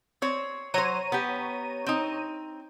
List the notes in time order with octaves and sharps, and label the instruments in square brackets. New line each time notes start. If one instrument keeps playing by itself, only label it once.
[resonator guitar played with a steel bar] C4 C#5
[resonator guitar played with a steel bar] F#3 C5 [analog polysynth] C#5 A#5 D#7
[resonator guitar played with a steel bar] B3 G4
C4 D#4